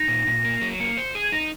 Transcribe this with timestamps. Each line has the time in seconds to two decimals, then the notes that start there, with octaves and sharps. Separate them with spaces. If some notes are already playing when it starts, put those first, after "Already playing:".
Already playing: D#4 A#6
0.08 A#2
0.27 A#2
0.45 A#3
0.61 F#3
0.79 A#3 C#7
0.97 C5
1.15 G#4
1.23 G#6
1.32 D#4 A#6